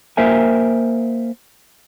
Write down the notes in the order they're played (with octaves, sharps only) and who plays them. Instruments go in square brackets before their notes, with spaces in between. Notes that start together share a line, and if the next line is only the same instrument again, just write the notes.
[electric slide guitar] A#3 A#4 C5 E5 G5 G#5